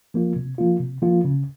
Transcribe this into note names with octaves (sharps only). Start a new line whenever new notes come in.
F3 A#3 F4
C3
F3 A#3 F4
C3
F3 A#3 F4
C#3